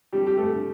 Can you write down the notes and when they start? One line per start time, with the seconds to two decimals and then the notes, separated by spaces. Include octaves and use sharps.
0.13 F2 G3 G4
0.27 G4
0.37 A3 A4
0.50 D3